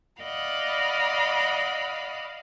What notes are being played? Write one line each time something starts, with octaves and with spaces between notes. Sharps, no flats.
D5 D#5 F5 F#5 B5